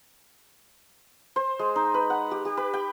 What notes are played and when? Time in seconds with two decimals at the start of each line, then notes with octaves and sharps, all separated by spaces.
1.36 C5
1.59 G#3
1.76 D#4
1.94 B4
2.10 F#5
2.31 G4
2.45 G4
2.57 B4
2.74 G5